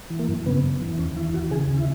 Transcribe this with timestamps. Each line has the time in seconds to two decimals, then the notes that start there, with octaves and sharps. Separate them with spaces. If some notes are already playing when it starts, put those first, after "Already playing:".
0.10 E3
0.19 A#3
0.28 F#2
0.46 C#3 B3
0.63 F#2
0.81 E3
0.99 D#2 C#4
1.16 E3 E4
1.33 D#2 F#4
1.51 C#3 G#4
1.69 D#2
1.77 E4